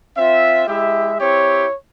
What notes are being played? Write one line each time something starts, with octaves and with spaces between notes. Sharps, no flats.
C4 F4 E5
G#3 E4 G4 E5
C4 E4 G4 C#5